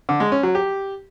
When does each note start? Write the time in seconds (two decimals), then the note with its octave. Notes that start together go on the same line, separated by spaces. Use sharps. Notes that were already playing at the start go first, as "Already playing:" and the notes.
0.09 D3
0.20 G#3
0.32 C#4
0.43 F#3
0.55 G4